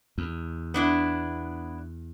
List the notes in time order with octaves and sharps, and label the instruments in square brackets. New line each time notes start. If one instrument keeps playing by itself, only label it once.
[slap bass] E2
[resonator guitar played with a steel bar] B3 D4 E4